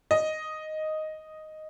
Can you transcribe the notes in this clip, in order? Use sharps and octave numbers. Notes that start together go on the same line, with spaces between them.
D#5